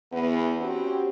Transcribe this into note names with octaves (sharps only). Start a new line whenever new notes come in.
E2 B3
C4 C#4 F#4 G4